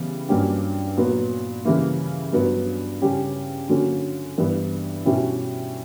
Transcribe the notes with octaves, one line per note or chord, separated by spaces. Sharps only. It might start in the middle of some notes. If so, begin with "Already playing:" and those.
Already playing: C#3 E3 G3 B3
G2 F#3 A#3 C#4 G4
A#2 F#3 B3
C#3 E3 G3 A#3 E4
G2 F#3 B3
C#3 G3 C#4 G4
D3 F#3 A#3 C#4 F#4
G2 E3 G3 B3
B2 G3 C#4 E4 G4